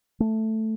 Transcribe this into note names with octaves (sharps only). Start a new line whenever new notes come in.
A3